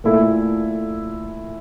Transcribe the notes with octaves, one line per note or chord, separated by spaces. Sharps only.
A#2 A3 E4 A4